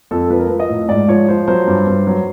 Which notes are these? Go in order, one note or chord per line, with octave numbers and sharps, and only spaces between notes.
F2 A4
F3 B4
A#4
F3 B4
D#5
A2
G#2 D5
F3 C#5
F3 C5
F#3 C5
G2
G2
F#3